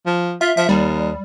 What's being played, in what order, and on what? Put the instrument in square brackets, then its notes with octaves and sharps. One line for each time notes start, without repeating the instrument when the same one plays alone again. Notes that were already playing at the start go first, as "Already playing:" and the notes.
[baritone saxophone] F3
[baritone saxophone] F4 [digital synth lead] E5
[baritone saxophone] F3 [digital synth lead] E5
[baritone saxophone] D#2 [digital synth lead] G3